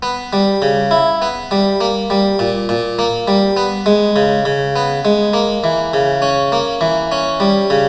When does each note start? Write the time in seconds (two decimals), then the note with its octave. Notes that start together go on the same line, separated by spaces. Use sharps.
0.03 B3
0.33 G3
0.62 C#3
0.91 E4
1.22 B3
1.51 G3
1.81 A#3
2.10 G3
2.39 A#2
2.69 A#2
2.99 A#3
3.28 G3
3.57 B3
3.86 G#3
4.16 C#3
4.45 C#3
4.76 B3
5.05 G#3
5.33 A#3
5.64 E3
5.93 C#3
6.22 C#4
6.52 A#3
6.81 E3
7.12 C#4
7.40 G3
7.70 C#3